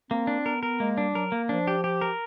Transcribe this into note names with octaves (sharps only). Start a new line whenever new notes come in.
A#3 C4
D4
B3 A#4
A#4
G#3 A#3
G3 D4
F#3 A#4
A#3
F3 D4
G4
G4
A#4